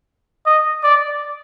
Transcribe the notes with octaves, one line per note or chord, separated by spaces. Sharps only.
D#5
D5